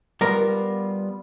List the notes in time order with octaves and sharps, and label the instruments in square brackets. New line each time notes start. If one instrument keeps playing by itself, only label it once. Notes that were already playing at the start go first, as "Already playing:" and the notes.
[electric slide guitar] G3 B3 F4 [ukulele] A#4